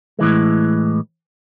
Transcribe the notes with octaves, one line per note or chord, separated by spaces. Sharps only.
A2 E3 G#3